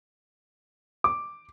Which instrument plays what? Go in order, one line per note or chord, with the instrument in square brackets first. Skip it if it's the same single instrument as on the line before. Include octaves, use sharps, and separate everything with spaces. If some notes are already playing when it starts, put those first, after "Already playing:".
[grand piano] D6